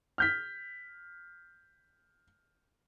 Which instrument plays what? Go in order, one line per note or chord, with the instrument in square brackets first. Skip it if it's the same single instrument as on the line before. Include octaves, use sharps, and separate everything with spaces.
[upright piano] F6 G6 B6